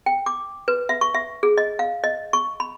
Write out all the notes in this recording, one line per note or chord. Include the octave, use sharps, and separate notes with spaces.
G5
D6
B4
E5
C#6
E5
G#4
D#5
F5
D#5
C#6
B5